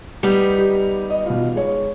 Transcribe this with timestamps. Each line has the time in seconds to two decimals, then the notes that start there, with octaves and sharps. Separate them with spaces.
0.23 G3 B3 D#4
0.58 G4
1.10 D#5
1.26 B2 F4
1.55 G#3 C#5